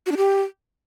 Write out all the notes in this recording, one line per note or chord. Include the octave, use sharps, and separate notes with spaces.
F#4
D4
G4